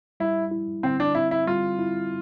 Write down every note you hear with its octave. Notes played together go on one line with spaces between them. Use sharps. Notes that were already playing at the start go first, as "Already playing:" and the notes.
G3 E4
E4
D3 C4
D4
C4 E4
E4
G3 F4
E4